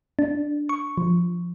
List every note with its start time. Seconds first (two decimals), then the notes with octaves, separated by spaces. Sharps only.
0.19 D4
0.69 C#6
0.98 F3